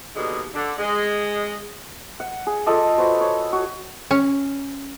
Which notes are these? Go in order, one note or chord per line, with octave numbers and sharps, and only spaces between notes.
D#2 B2 D3 G#3
D3
G#3
F#5
G#4
F4 A4 D5 D#5
F#4 B4 C5
C#5
F#4
C#4